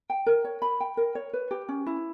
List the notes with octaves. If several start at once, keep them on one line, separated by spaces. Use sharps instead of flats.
G5
A#4
C#5
B5
G5
A#4
C#5
B4
G4
C#4
E4